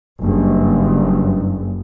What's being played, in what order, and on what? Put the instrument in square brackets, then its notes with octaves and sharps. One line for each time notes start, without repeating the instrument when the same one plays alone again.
[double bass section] F#1 [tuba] G2